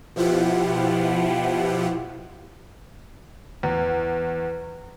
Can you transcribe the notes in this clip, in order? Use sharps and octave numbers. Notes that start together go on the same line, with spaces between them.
B2 F3 E4 F4 G4 F#5
E2